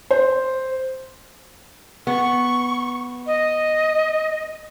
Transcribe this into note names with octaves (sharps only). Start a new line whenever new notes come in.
C5
B3 C#6
D#5